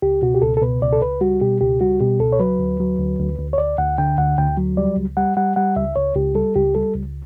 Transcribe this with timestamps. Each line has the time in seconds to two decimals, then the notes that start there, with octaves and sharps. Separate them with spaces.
0.02 C#2 G4
0.22 B2 F#4
0.34 G4
0.42 C#2 A4
0.57 A4
0.61 B2 B4
0.82 C#2 D5
0.93 A4
1.01 C#2 B4
1.21 G3 F#4
1.41 B2 G4
1.61 C#2 G4
1.81 G3 F#4
2.00 B2 G4
2.20 C#2 A4
2.32 C#5
2.40 F#3 B4
2.59 D2
2.80 F#3
2.99 D2
3.19 D2
3.38 D2
3.53 C#5
3.58 D2 D5
3.78 D2 F#5
3.98 D3 G5
4.18 D2 F#5
4.38 D2 G5
4.57 F#3
4.77 G3 D5
4.97 C#2
5.17 G3 F#5
5.37 G3 F#5
5.56 G3 F#5
5.76 C#2 E5
5.96 C#2 C#5
6.15 C#2 G4
6.35 G3 A4
6.55 C#2 G4
6.75 G3 A4
6.95 C#2